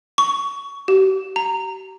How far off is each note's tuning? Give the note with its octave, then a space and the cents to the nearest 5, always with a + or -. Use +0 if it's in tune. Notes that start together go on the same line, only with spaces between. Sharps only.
C#6 +20
G4 -40
A#5 -15